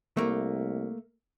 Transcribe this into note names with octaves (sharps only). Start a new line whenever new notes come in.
C2 A3 A#3